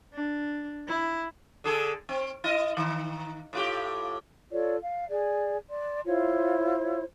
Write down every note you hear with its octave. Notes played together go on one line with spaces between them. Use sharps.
D4
E4
D3 G#4 A4
C4
E4 D#5
D#3
A2 F4 G4
F4 A4 C#5 D5
F5
G#4 D5
D5 C6
E4 F4 C5 C#5